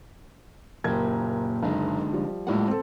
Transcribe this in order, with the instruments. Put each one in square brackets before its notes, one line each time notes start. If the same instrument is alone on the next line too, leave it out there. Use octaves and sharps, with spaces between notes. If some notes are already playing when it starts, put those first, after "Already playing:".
[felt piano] F#1 A#4 G#6 [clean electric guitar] A#2 G4
[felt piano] F#1 [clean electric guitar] D3 G#3 D#4
[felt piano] F3 G3
[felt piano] A2 G3 A#3 [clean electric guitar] G#3 F4 F#5
[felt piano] C4 A4